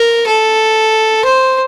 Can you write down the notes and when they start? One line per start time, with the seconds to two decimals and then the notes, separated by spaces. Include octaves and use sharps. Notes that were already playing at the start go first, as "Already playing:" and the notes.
Already playing: A#4
0.27 A4
1.25 C5